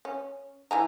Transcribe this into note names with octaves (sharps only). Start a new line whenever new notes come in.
C#4
E3 G#5 A#5